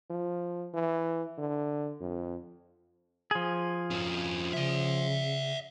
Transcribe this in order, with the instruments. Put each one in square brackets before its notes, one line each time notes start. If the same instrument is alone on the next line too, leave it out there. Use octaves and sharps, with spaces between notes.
[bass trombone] F3
E3
D3
F2
[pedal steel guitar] F3 G#4
[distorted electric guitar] F2 C#4
[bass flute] C#3 [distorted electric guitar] D5 E5